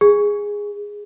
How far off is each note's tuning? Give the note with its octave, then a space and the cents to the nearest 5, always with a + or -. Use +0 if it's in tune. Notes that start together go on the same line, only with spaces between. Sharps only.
G#4 -10